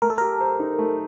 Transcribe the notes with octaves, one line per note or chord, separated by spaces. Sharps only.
A3 A#4
A4
G4 A#4
C5
D#4
A3